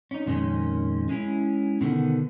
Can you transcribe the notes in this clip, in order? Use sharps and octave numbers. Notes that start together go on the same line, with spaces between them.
C#4 D#4
F2 A#2 D#3 G#3 C#4
G#3 C#4 E4
B2 D3 D#3 B3